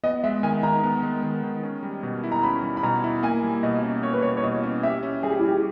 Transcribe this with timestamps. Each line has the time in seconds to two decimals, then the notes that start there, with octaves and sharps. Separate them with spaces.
0.03 B3 D#5
0.23 G#3 E5
0.43 D#3 G#5
0.63 D#3 A#5
0.83 B3
1.03 G#3
1.23 D#3
1.43 D#3
1.63 C#4
1.83 G3
2.03 B2
2.23 E4
2.32 A#5
2.43 C#4 B5
2.63 G3
2.77 B5
2.83 B2 A#5
3.04 E4
3.23 A#3 G#5
3.43 G3
3.63 B2 D#5
3.83 C#4
4.03 A#3 C#5
4.13 B4
4.22 G3 C#5
4.37 C#5
4.44 B2 D#5
4.63 C#4
4.83 G4 E5
5.03 C#4
5.23 G3 G#4
5.31 G4
5.39 E4
5.43 G3 G4